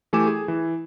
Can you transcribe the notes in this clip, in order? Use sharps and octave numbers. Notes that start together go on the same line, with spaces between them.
E3 A3 G4 G#5 D6 E7
G#4
E3